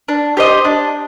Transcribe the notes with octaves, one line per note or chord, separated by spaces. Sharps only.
D4
G4 C5 D#5
D4